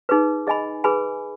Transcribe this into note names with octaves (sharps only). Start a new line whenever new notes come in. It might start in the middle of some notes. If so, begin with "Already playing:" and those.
D#4 G#4 B4
G#4 D#5 G#5 B5
G#4 B4 G#5 B5